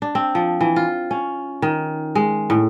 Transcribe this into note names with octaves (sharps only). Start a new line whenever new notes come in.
D4
C4
F3
E3
F4
C#4
D#3
G#3
A2